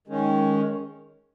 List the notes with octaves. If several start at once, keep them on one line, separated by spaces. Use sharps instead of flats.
D#3 G#3 C#4